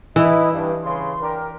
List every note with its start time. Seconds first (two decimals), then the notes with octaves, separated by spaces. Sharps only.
0.16 E3 E4 D#5
0.52 G2
0.84 C#3 B4 C6
1.21 D4 G4 A#4